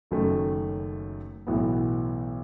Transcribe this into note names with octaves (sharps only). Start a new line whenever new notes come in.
F#1 F#2 D#3 A3
B1 A2 E3 B3